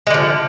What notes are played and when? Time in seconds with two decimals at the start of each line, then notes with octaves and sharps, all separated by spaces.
0.07 G#3
0.10 D3
0.14 F3